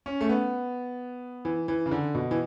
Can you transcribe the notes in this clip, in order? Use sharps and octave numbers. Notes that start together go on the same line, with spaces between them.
C#4
A3
B3
E3
E3
C#3
D3
B2
E3